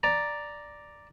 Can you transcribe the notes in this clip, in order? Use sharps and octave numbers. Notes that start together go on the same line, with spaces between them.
D5 A#5